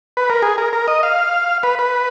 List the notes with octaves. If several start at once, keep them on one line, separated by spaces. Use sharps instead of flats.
B4
A#4
G#4
A#4
A#4
D#5
F5
B4
B4